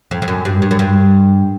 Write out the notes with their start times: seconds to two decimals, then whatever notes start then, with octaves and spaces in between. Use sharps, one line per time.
0.11 F2
0.22 F2
0.28 F#2
0.45 G2
0.62 G2
0.71 F#2
0.79 G2